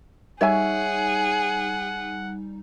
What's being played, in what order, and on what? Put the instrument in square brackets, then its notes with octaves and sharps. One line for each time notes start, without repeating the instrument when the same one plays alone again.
[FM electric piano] G3 D#4 [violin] G#4 [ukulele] C#5 E5 G#5 [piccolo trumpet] F#5